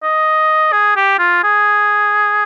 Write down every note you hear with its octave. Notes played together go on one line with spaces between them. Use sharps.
D#5
G#4
G4
F4
G#4